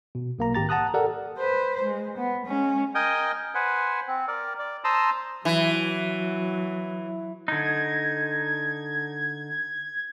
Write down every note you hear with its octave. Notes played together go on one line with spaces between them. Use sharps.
B2
B1 A#3 A#5
G#1 G4 A#5 A6
F#5 A5 A#5 D#6 F#6
G4 A4 A#4 D5 F#5
B4 C5
G#3
B3
G#3 C#4
A#4 D#5 G5 G#5 D#6
B4 C5 F#5 G#5
C4
A#4 D5
D5
C5 A5 A#5 C6 D#6 E6
E3 F#3
D3 D#4 G#6